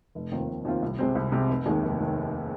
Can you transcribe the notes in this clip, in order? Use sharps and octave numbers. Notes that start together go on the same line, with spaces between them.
F1
D#2 D#3 C4 F4
F1
D#2 D#3 C4 F4
C2
C3 G#3 C4
C2
C3 G#3 C4
F1
D#2 D#3 G#3
F1
D#3